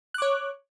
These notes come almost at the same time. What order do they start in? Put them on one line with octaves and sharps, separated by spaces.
F#6 D6 C#5